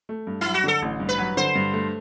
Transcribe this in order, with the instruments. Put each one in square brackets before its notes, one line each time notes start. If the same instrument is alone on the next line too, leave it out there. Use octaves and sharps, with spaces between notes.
[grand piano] A3
G2
[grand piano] F#3 [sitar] E4
[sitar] F#4
[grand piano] D3 [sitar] A4
[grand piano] A1
G2
[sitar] B4
[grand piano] F#3
[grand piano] D3 [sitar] C5
[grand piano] G2
A3